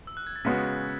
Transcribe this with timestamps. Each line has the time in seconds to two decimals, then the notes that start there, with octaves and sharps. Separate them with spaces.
0.07 E6
0.17 F#6
0.27 G#6
0.36 A6
0.45 C#3 G#3 B3 F#4 B6